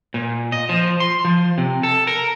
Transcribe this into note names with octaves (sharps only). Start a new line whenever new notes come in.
A#2
D#5
F3
C6
F3
C3
A4
A#4